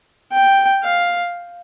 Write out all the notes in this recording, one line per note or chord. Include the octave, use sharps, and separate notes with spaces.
G5
F5